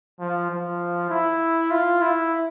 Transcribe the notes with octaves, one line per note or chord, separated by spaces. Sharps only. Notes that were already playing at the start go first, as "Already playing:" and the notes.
F3
F3
E4
F4
E4